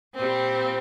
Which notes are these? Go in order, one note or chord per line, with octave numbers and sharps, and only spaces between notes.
A#2 G3 C4